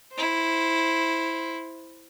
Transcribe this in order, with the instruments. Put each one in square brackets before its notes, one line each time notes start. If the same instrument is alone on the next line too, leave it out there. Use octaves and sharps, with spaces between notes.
[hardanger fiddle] E4 C5